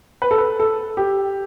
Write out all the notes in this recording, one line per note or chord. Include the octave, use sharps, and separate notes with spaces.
B4
A4
B4
A4
G4